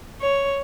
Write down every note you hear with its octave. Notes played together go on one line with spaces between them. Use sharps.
C#5